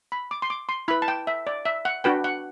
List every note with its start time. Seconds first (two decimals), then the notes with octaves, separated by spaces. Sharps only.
0.12 B5
0.31 D6
0.42 C6
0.50 D6
0.69 C6
0.88 E4 B4 B5
1.02 A5
1.08 G5
1.27 E5
1.47 D5
1.65 E5
1.85 F#5
2.04 D4 F#4 B4 G5
2.24 F#5